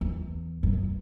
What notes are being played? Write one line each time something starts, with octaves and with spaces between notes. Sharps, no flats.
E2
F#2
E2